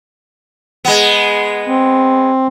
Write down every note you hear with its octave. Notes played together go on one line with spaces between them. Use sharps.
G#3 B3
C4